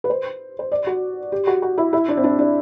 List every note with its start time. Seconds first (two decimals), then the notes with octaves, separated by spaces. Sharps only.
0.04 B4
0.10 C5
0.59 C5
0.72 D5
0.87 F#4
1.32 G4
1.47 F#4
1.62 F#4
1.78 E4
1.93 E4
2.08 D4
2.17 C4
2.24 D4
2.39 D4